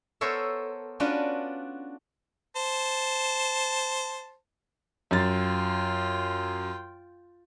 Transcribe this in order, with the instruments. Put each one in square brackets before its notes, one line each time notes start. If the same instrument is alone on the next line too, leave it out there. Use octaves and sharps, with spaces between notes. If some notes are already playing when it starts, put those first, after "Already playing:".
[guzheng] B3 A4 A#4 C5 C#5 E5
C#4 D4 F4 F#4 B4 D5
[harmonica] C5 A5
[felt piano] F#2 A6 [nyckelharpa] F4 G5